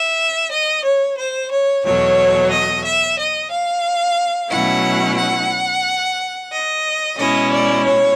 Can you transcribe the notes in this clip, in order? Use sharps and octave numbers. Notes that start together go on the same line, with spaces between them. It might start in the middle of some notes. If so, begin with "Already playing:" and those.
Already playing: E5
D#5
C#5
C5
C#5
E2 B2 F#3 A3 C#5
D#5
E5
D#5
F5
B2 F#3 A3 C#4 E4 F#5
F#5
D#5
B2 G#3 C#4 E4 D#5
D5
C#5